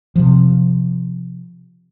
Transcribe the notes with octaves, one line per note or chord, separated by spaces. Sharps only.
C3 F3